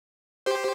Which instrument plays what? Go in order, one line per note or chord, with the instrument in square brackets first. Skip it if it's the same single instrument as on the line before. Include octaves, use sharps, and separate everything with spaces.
[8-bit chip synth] G4 C5